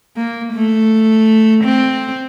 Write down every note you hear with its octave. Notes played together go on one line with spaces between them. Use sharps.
A#3
A3
C4